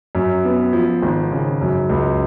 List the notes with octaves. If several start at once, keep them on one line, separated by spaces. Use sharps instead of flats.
F#2
B3
F3
G#1
C#3
F#2
C#2